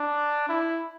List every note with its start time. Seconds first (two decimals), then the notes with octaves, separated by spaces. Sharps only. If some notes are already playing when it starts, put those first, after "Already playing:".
Already playing: D4
0.49 E4